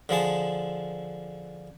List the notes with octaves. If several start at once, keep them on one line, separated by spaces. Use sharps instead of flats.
D3 F3 G#4 A5